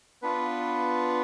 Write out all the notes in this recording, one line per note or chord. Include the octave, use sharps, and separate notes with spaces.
B3 D4 F4 B4